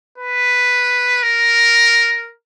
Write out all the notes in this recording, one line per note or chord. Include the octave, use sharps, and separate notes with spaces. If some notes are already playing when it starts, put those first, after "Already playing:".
B4
A#4